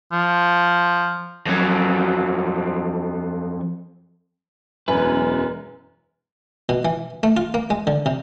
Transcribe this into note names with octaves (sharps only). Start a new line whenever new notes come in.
F3
F2 F#3
E1 F#2 B4 G#5
B2
E3
A3
F4
A#3
G#3
D3
C3